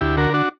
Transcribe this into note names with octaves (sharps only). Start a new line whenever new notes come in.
D2 E4 G4
D3 F#4 A#4
D4 F#4